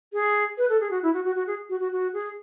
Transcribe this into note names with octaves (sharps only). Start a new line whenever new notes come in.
G#4
B4
A4
G#4
F#4
E4
F#4
F#4
F#4
G#4
F#4
F#4
F#4
G#4